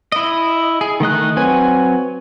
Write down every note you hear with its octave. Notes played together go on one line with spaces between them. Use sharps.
E4 D#5
G#4
D#3 A3 D#5 F#6
F#3 C4 B4 C#5 G#5